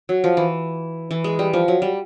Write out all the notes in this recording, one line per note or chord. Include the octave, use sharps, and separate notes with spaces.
F#3
F3
E3
E3
G#3
G3
F3
F#3
G3